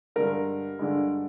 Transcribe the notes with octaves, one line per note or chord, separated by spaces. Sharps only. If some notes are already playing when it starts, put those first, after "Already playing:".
G2 D3 G#3 A#4
G2 D3 G#3